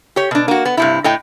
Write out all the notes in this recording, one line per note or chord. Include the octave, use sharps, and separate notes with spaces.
G4 C#5
B2 D4
A#3 F#4
B3
G2 C3 E4
A2 D#5 G5